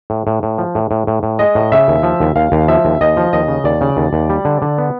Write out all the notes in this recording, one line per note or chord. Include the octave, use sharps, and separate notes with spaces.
A2
A2
A2
F3
A2
A2
A2
A2
G#3 D#5
A2
C#3 E5
D#2
F3
D#2
D#2 F5
D#2
F3 E5
D#2
D#2 D#5
F3
D#2 D#5
C#3
D#2 D5
C#3
D#2
D#2
G3
D3
D3
B3